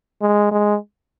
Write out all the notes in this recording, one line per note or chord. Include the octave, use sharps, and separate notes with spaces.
G#3
G#3